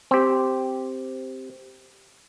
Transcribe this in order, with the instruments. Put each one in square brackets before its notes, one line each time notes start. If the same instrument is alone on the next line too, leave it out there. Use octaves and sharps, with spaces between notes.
[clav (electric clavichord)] C4 G4